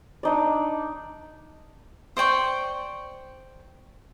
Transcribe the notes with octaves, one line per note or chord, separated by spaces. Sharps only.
D4 D#4 D5
C5 D5 G5 C#6